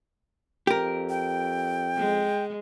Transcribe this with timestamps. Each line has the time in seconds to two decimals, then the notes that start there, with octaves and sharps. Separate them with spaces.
0.67 F2 G4 A#4
1.09 G5
1.97 G#3